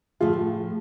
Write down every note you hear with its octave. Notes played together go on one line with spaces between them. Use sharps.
A2 F3 A3 F4 G#4